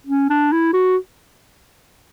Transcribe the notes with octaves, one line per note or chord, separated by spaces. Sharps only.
C#4
D4
E4
F#4